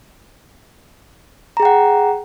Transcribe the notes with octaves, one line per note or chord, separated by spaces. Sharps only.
G#4 F#5 G5 A#5